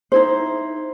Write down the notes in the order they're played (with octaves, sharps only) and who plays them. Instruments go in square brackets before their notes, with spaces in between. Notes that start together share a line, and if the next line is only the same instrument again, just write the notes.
[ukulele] D#4 E4 C5